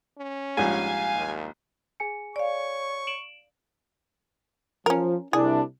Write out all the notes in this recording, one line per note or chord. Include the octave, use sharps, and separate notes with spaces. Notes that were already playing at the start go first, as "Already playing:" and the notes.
C#4
A#1 G#2 G3 F5 G#5
D#2
G#4 G#5 C#7
C#5 D5 F5 C#6
D7 E7 F#7
F3 C#4 A#4
C2 D4 E4 G#4